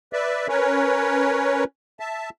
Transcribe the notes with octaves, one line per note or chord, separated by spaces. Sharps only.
B4 D5 E5
C#4 A#4 B4 C#5
E5 A5